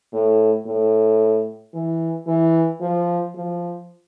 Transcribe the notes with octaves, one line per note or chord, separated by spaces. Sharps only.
A2
A2
E3
E3
F3
F3